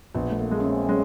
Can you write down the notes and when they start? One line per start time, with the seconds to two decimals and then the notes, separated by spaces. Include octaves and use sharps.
0.15 A#1 B3
0.31 A3
0.39 A#3
0.51 G#3
0.60 C#4
0.64 C4
0.89 G#3 C#4